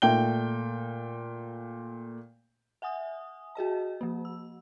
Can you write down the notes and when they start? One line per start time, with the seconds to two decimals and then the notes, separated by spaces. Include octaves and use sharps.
0.02 A#2 A3 G5 G6 G7
2.82 E5 F#5 G#5 D#6
3.55 F#4 G#4 D#5 A5
4.01 F3 A#3
4.25 E6